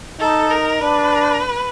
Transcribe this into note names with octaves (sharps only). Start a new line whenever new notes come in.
D#4 A4
A#4
D4 B4